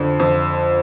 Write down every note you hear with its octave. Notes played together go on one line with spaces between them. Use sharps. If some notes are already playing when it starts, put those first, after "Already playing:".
Already playing: F2 D3
F2